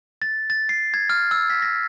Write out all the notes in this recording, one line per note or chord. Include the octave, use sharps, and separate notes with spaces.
A6
A6
C7
G#6
F6
E6
B6
A#6